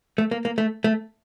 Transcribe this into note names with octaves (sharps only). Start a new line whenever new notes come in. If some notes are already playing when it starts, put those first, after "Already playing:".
A3
A#3
A#3
A3
A3